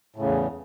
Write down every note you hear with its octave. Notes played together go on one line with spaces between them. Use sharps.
E2 A2 C#3